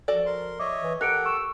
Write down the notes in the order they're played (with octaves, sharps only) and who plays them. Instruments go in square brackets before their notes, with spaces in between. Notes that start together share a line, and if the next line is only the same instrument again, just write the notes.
[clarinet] F3 [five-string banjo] F#4 A4 D5
[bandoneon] A#4 C6
[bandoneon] C#5 D#5 E5 [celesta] C#6 D6
[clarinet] E3
[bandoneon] G4 A4 [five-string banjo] A#4 [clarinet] F#5 [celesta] F#6 C#7 D7
[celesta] C#6 [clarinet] E6